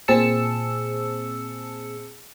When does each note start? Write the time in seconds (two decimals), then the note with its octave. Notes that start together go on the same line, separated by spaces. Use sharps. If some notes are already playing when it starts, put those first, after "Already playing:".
0.08 A#2 C4 G#4 A5 E6 C#7